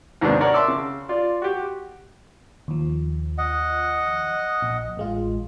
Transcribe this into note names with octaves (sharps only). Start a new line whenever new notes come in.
D#2 G#2 C3 B3 D4
A#4 C#5 D5 F#5
E5 A5 C6 D6 E6
C#3
F4 D5
F#4 G4
D#2 F3
D#5 F#5
A#1
A1 G#3 F4